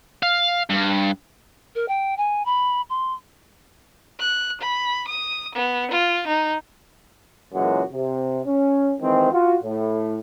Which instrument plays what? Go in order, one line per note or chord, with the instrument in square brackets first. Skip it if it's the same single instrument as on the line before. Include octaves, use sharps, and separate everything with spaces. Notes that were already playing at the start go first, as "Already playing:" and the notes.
[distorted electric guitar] F5
G2
[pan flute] A#4
G5
G#5
B5
C6
[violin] F#6
B5
D#6
B3
F4
D#4
[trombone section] F#2 A#2 E3 F#3 G#3 F#4
C3
C#4
D#3 E3 G#3 C4
F4 F#4
A2